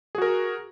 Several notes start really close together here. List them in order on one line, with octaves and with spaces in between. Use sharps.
G#4 F#4 A#4